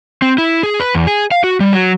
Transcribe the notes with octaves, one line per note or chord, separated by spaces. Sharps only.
C4
E4
G#4
B4
E2
G#4
F5
F#4
G3
F#3